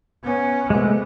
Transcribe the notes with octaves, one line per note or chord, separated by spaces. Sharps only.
B3 C#4
C3 G#3 A3 B3